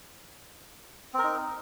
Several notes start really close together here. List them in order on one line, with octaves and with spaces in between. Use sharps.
C4 A#4 D#4